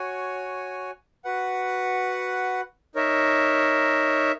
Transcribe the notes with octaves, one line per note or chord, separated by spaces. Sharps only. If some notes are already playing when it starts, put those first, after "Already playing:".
Already playing: F#4 C#5 G#5
F#4 B4 F#5
D#4 A#4 C#5 E5